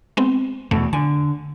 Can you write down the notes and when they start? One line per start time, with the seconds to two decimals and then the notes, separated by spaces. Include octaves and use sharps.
0.17 G#3 B3 C4
0.71 E2 B2 A3
0.93 D3 G#5